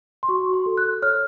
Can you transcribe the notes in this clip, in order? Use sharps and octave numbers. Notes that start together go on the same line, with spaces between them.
C6
F#4 C#6
C6
A4
F#6
C#5 F6